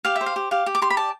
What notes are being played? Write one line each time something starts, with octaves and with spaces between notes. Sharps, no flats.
G4 F5
E5
C5
F5
G4
G4 F5
G4
D6
G4 C6
B5
D5 A5